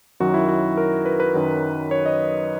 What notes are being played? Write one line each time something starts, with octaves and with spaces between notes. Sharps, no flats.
F#2 D#3 F#3 F#4
E4
F#4
A#4
B4
B4
F#2 D#3 F#3
C#5
D#5